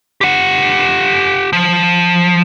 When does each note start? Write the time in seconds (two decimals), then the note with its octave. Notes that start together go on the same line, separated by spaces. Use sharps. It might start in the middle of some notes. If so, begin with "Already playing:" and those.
0.21 G4 F#5
1.53 F3